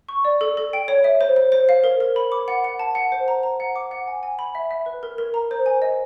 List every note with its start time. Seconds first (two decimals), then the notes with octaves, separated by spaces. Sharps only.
0.09 C#6
0.25 D5
0.41 A4
0.57 A4
0.73 G5
0.88 C#5
1.04 E5
1.21 C5
1.36 C5
1.52 C5
1.69 F5
1.84 A#4
2.00 A#4
2.16 B5
2.32 D6
2.48 F#5
2.64 F#5
2.79 A5
2.95 F#5
3.12 C5
3.28 A#5
3.43 A#5
3.60 F#5
3.76 D6
3.91 F#5
4.07 G#5
4.23 G#5
4.39 B5
4.55 E5
4.71 E5
4.86 B4
5.03 A#4
5.18 A#4
5.34 A#5
5.51 C5
5.66 G#5
5.82 D#5